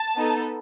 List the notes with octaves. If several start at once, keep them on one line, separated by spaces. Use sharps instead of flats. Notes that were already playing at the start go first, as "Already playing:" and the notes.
Already playing: A5
B3 D#4 A4